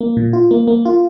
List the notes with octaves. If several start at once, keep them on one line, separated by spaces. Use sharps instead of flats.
A#3
A#2
F4
A#3
A#3
F4